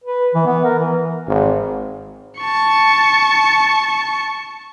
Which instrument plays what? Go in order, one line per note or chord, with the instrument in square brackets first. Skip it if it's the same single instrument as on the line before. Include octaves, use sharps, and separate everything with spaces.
[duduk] B4
E3
B3
A#4
E3
[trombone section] G#1
[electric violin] A5 C#6